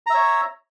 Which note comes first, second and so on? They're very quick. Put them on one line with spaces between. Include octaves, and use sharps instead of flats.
A#5 E5 C#5